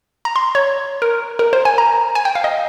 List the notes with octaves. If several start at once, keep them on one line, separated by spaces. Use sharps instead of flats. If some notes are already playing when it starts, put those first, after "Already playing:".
A#5
C6
C#5
A#4
A#4
C5
G#5
A#5
G#5
G5
F5
D#5